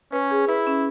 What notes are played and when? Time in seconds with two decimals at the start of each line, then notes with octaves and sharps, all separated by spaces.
0.12 C#4 B4
0.31 G#4
0.48 E4 B4
0.67 C#4